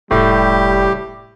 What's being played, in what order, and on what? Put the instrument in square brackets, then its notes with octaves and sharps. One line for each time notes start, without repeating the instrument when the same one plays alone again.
[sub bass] F1 [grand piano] A2 [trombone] G3 [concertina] G4